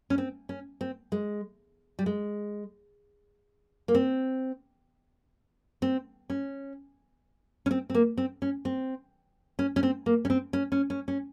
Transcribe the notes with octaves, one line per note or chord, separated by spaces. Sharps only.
C#4
C4
C#4
C4
G#3
G3
G#3
A#3
C4
C4
C#4
C#4
C4
C4
A#3
C4
C#4
C4
C#4
C#4
C4
A#3
C#4
C4
C#4
C#4
C#4
C#4